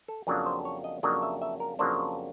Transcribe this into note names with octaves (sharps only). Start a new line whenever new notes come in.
A4
F2 C#3 F#3 A#3 D4
C5
C#5
D#5
F2 C#3 F#3 A#3 D4 D#5
E5
E5
A#4
F2 C#3 F#3 A#3 D4 C5